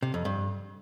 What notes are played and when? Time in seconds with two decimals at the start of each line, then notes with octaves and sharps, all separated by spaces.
0.03 C3
0.14 F2
0.25 G2